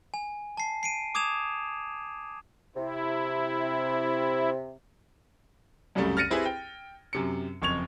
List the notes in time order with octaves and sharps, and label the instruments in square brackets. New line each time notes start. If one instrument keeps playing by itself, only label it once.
[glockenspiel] G#5
A5 C7
C7 D7 D#7
D6 D#6 G#6 E7 F7
[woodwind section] C3 [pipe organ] E4
[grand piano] C2 F#2 C#3 G3 A3
F6 A6 A#6 C#7 D#7
C4 E4 G4 G#4 B4
G5
F#2 C3 C#7
F#1 F2 C#6 G#6 F7